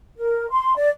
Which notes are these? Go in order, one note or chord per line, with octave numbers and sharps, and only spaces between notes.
A#4
C6
D5